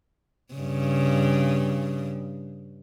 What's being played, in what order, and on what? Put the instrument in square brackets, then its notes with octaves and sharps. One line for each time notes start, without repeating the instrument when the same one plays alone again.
[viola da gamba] G2 C#3